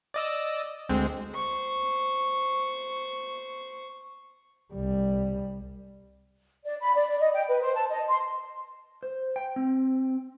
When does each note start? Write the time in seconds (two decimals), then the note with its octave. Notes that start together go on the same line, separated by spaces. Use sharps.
0.14 D5 D#5 E6
0.89 D2 G#3 C4
1.33 C5 C#6
4.73 C2 G3
6.65 D5
6.81 B5
6.96 D5
7.08 D5
7.20 D#5
7.33 G5
7.49 B4
7.62 C5
7.76 A5
7.90 D#5
8.08 C6
9.03 C5
9.36 G5
9.56 C4